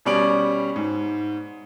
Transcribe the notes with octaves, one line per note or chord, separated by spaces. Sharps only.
B2 G3 C#4 D5 D7 F#7
G#2